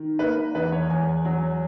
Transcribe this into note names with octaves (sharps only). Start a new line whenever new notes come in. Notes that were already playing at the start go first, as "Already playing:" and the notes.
Already playing: D#3
A#3 B4
E2 B4
C#5
E2 G#5
F#3